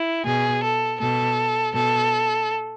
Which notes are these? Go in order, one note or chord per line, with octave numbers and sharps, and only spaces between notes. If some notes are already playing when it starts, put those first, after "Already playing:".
Already playing: E4
B2 G#4
A4
B2 A4
B2 A4